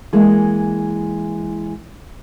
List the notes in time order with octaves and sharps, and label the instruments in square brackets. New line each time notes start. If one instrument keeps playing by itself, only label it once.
[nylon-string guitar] E3 G#3 A#3